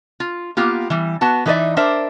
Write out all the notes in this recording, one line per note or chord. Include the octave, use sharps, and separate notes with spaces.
F4
A#3 B3 F4 G4
E3 G3
B3 F#4 A5
E3 D#4 G#4 B4 D5 E5
D4 A#4 C5 D5 E5